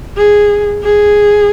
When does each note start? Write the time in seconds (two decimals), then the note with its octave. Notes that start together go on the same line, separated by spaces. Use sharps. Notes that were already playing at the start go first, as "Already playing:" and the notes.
0.17 G#4
0.83 G#4